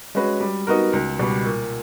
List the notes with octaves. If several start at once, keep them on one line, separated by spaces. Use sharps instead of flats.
G#3 C#4 F#4 B4
G3
B3 D#4 F#4 A#4
C#2
B2 G3
A#2